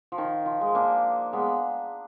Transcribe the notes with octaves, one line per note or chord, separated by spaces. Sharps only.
F3
D#3
F3
G#3
A#3 D4
G#3 B3